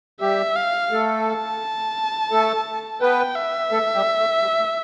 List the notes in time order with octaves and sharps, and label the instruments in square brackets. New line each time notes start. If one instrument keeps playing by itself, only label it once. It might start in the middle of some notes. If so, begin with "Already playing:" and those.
[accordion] G3 G4 [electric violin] E5
[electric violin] F5
[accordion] A3 A4
[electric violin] A5
[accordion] A3 A4
[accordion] B3 B4 [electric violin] G5
[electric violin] E5
[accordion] A3 A4
G3 G4
A3
G3
A3